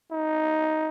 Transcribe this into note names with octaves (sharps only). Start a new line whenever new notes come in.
D#4